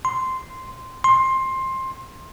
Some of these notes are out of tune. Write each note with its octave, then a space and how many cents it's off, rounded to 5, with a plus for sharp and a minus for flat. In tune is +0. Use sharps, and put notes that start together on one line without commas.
C6 -10
C6 +15